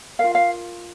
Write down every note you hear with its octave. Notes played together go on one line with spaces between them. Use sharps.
F4 A#4 F5
F5